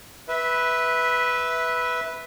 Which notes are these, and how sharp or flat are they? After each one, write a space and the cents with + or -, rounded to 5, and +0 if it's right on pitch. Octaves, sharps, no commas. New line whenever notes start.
B4 +0 E5 -15